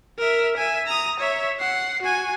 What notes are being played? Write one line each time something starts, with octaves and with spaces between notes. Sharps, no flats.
A#4 E5
E5 G#5
A#5 D#6
C#5 E5
F#5 C7
F#4 G#5